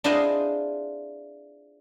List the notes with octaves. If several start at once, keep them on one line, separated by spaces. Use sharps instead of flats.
D4 E4 F4 G#4 C5 D#5